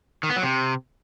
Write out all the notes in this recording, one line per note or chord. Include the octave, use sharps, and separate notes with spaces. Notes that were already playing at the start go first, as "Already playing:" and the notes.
D#3
B3
F#3
C3